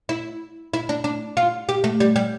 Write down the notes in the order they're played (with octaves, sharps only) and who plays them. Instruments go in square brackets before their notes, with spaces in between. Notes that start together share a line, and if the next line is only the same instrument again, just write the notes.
[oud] E4
E4
D4
D4
F4
G4
A3
G3
G3